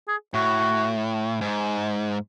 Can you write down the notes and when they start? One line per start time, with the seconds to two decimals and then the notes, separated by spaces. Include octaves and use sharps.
0.08 G#4
0.34 A2 F#4
1.41 G#2